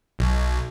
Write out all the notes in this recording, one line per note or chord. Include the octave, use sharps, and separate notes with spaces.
B1